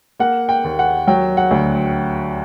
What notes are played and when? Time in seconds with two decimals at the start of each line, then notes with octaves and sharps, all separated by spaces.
0.20 A#3 F#5
0.49 G5
0.64 D#2
0.79 F#5
1.07 F#3 G5
1.37 F#5
1.51 D2